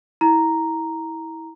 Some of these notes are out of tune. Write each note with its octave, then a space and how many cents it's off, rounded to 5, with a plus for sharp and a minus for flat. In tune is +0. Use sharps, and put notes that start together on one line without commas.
E4 -25 A#5 +0